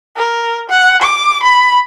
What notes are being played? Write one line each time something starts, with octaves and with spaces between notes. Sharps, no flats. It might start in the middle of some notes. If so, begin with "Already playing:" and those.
A#4
F#5
D6
B5